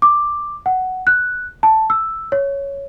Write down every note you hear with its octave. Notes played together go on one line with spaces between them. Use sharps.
D6
F#5
F#6
A5
E6
C#5